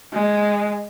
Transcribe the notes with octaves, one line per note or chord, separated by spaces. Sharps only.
G#3